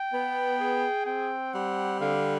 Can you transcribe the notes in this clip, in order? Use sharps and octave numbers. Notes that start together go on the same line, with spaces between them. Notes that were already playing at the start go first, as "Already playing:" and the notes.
Already playing: G5
B3
G#4
C4 G5
G3 F#5
D3 F5